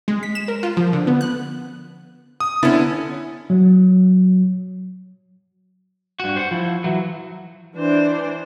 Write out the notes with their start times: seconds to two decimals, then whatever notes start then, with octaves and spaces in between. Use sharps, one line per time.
0.08 G#3
0.23 B6
0.35 E7
0.48 A#4
0.63 F4
0.77 F3
0.93 D3
1.07 B3
1.21 F#6
2.40 D#6
2.63 D3 B3 C#4 E4
3.50 F#3
6.20 G2 F#4
6.36 C5 F#5
6.51 F3 E4
6.84 E3 F#3
7.75 E3 D4 C5